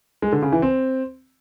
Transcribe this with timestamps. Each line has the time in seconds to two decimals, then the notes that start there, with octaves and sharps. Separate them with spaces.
0.22 G#3
0.32 D3
0.42 C#3
0.52 E3
0.62 C4